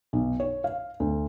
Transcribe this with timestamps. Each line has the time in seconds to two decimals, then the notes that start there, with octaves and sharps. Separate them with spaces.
0.13 B1
0.40 C#5
0.64 F5
1.00 D2